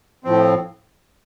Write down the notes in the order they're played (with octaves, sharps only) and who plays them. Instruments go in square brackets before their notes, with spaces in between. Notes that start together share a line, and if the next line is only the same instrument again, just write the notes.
[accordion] A2 F3 C4